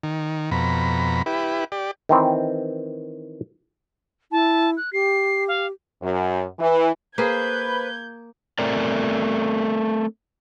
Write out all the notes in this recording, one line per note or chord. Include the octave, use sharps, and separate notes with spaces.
D#3
F2 B2 A#5 B5
E4 G4 B4
G4 D5
D#3 E3 C4
E4 A5
F#6
G4 C7
F5
F#2
E3
A#3 G#4 B4 C5 G6 G#6
A3 C4 A#4 D5